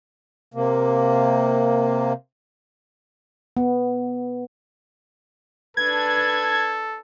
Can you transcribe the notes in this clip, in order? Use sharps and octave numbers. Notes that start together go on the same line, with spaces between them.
C3 A#3
B3
D4 A4 B4 G#6